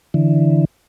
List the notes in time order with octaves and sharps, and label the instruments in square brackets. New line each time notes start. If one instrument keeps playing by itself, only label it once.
[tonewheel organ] D3 E3